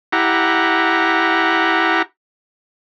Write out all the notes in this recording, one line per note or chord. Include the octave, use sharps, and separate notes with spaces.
E4 G4 F#5 A#5